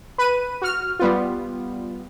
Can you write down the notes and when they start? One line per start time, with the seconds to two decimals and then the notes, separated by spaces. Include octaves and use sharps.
0.18 B4 D#7
0.62 F#4 F6
0.99 G3 B3 F4